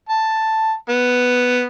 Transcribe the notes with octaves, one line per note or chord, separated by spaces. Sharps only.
A5
B3